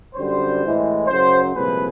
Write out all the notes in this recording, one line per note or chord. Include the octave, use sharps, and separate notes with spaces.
F#2 D3 G3 C5
A2 E3 G#3
F#2 C#3 F#3 C5
C2 A#2 F3 G#3 B4